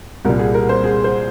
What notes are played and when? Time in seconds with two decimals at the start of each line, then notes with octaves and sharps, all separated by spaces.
0.25 C2 A#2 G3 A#4
0.39 G#4
0.54 A#4
0.69 C5
0.84 G#4
1.04 C5